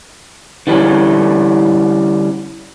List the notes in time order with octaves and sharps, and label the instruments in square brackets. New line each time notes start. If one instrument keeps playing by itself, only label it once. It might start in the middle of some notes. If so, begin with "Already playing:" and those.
[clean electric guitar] D3 E3 G3 C#4